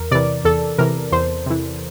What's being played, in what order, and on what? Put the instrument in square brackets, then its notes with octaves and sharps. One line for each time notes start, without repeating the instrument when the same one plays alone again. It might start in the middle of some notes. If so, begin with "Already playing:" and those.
Already playing: [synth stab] E2 A#4
C3 E3 D5
E2 A4
C3 E3 A#4
E2 C5
C3 E3